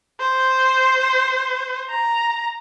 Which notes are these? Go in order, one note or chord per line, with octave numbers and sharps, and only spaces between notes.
C5
A#5